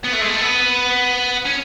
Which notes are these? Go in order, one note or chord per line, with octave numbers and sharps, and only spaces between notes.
B3
A3
G#3
A3
B3
C#4